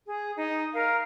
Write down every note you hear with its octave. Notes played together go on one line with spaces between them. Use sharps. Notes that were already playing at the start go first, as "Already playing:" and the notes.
G#4
D#4
A#4 F5